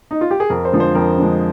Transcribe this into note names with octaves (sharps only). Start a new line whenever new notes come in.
D#4
F4
G4
G#4
F2 A#4
C5
D3 F3 G#3
C5
F2 A#4
D3 F3 G#3